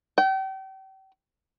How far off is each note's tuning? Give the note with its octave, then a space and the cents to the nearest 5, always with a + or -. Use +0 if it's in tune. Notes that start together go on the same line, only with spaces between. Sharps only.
G5 -35